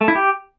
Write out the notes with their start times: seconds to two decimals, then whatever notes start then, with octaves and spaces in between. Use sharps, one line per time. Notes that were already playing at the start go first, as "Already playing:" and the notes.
0.01 A3
0.08 E4
0.15 G4